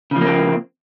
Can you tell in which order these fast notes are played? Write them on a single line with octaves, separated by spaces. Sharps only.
C#3 F3 A#3 C4